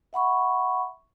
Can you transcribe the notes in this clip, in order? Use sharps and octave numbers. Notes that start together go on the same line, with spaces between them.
E5 F#5 B5 C#6